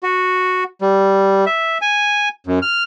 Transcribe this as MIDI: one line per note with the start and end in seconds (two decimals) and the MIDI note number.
0.03 0.64 66
0.81 1.45 55
1.46 1.78 76
1.82 2.29 80
2.47 2.59 42
2.62 2.83 89